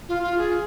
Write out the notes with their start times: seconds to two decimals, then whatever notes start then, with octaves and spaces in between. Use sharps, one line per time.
0.09 F4
0.23 F4
0.38 G#4